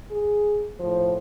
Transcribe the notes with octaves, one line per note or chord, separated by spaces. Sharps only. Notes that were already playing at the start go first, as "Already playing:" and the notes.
G#4
A2 F3 C5